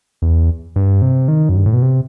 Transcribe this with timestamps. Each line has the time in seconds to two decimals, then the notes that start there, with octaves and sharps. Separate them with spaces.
0.22 E2
0.76 G2
1.02 C3
1.28 D#3
1.49 F#2
1.56 G2
1.66 A2
1.74 B2
1.82 C3